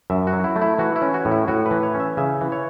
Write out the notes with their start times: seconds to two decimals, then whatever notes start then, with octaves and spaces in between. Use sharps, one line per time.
0.10 F#2 E5
0.27 F#4
0.33 F#3
0.44 E4
0.56 A3
0.62 E4
0.78 E3 F#4
0.96 E4
1.02 C#4
1.14 F#4
1.25 A2
1.31 E4
1.48 A2 F#4
1.66 B4
1.71 E3
1.83 C#5
1.95 C#4
2.00 E5
2.17 C#3 E5
2.41 E3
2.52 C#5